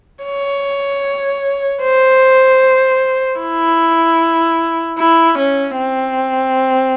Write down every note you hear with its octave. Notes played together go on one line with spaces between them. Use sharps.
C#5
C5
E4
E4
C#4
C4